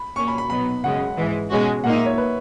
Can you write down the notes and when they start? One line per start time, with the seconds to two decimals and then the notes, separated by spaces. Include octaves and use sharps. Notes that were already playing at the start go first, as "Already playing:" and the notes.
Already playing: B5
0.16 A#2 A#3 C#4 C#6
0.28 B5
0.38 B5
0.50 B2 F#3 B3 D#4 B5
0.83 F#2 C#3 G#3 F#5
1.17 G#2 E3 G#3
1.50 B2 G#3 C#4 F#4
1.84 A#2 A#3 D#4 F#5
1.95 E5
2.06 C#5
2.18 B4